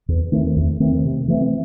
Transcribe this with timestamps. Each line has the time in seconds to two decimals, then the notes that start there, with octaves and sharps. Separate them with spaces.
0.08 E2
0.32 D#3 A3 C4
0.56 E2
0.80 D#3 A3 C4
1.04 C3
1.28 E3 A3 C4